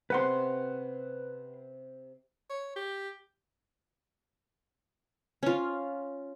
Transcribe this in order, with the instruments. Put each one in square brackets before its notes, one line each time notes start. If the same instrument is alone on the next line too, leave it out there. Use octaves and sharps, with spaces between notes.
[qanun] C3 C4 C#4 [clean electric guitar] B4 F#5 C6
[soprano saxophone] C#5
G4
[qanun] C#4 F4